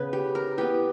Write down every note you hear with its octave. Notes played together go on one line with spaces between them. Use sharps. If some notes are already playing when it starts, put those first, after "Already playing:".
Already playing: C#3 B3 B4
G4
A#4
E3 B3 G4